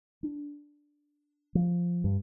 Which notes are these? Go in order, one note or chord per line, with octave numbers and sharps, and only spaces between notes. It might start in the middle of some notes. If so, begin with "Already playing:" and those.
D4
F3
G2